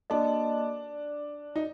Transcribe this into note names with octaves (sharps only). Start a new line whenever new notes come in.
A#3 D4 F#4 A4 D#5 A5
D#4